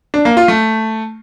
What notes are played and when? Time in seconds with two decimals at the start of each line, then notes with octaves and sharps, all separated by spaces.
0.14 D4
0.25 A#3
0.37 F4
0.48 A3